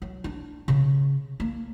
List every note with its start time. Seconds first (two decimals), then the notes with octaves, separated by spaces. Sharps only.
0.02 F#3
0.24 D4
0.68 C#3
1.40 A#3